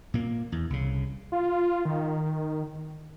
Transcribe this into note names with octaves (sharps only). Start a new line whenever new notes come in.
A#2 A#3
E2
C2 C#3
F4
D#3